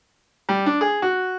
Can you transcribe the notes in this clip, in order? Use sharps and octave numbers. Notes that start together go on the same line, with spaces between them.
G3
D4
G#4
F#4